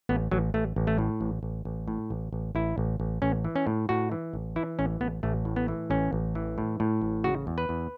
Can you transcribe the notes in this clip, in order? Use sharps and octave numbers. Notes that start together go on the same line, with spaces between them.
A1 B3
A1 F#3
A1 A3
A1
A3
A2
A1
A1
A1
A2
A1
A1
A1 E4
A1
A1
A1 C#4
E3
C#4
A2
A2 F#4
E3
A1
E3 E4
A1 C#4
A1 B3
A1 A3
A2
B3
E3
A1 C#4
A1
E3
A2
A2
A1
C#3 F#4
E2
B4
E2